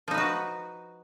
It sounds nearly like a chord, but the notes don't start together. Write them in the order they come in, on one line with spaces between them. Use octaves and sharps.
F3 D#4 B4 F#4